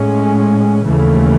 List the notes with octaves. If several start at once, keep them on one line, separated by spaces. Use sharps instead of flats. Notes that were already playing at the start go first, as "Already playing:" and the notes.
Already playing: A2 G#3 C#4
D#2 C#3 E3 A3